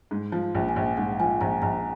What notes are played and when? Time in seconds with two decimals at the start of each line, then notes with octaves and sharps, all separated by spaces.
0.11 G#2
0.32 F3
0.55 A#1
0.69 G#5
0.76 A#1
0.97 G#2 F#5
1.20 F3 G#5
1.41 A#1 A#5
1.62 A#1 A#5